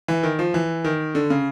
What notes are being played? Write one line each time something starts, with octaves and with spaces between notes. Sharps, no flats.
E3
D#3
F3
E3
D#3
D3
C#3